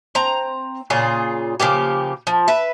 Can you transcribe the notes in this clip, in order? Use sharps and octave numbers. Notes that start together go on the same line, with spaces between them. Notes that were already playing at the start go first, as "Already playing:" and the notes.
C4 A#5
A#2 C#3 F4 G#4
C#3 F3 A#3 G4
F3
B4 E5